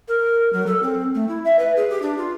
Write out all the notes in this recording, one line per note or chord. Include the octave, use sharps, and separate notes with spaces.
A#4
F#3
A4
C4
A3
E4
E5
B4
G#4
G4
D4
F4